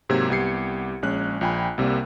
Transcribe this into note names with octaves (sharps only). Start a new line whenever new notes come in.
G#2 C3 F#3 A#3 G4 G#6
C2 B3 G4 G#6 C7 C#7
A#1 G#3 C#4 F#6
A#1 F4 G5 G#5 B5
C2 C3 G3 A#3